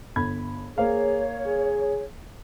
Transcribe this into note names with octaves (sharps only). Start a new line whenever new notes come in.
G1 B5 G#6
A#3 G#4 C5 C#5 F5
G#4